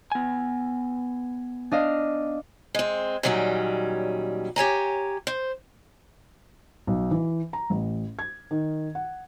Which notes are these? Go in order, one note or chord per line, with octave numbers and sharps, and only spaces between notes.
B3 G#5
D4 D#5 F5
G#3 C4
A#2 D#3 F#3 G3 C#4
G4 C#5 G#5 A#5
C5
B1
E3
A#5
A1
G#6
D#3
F#5